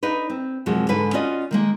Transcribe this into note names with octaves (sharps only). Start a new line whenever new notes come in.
D4 D#4 B4
C4
F#2 C3 F3 G#3 F#4
G#2 D3 B4 G#5
C#4 F4 F#4 D5 D#5
D#3 G#3 A#3